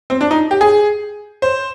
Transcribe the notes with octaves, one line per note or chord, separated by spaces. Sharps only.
C4
D4
D#4
G4
G#4
C5